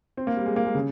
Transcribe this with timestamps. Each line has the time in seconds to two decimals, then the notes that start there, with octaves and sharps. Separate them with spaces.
0.17 C4
0.27 A#3
0.37 G3
0.46 G#3
0.56 A#3
0.65 G#3
0.75 C#3